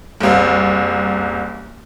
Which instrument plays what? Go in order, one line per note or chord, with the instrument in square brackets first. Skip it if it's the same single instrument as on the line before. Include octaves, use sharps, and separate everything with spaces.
[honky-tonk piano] F#1 C2